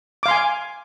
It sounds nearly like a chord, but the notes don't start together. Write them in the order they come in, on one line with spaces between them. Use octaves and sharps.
D6 F5 C6 G#5